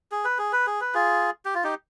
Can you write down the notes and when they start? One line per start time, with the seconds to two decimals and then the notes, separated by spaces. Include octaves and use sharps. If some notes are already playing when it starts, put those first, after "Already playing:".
0.12 G#4
0.25 B4
0.38 G#4
0.53 B4
0.67 G#4
0.81 B4
0.94 F4 G#4
1.45 G4
1.55 F4
1.64 D#4 G4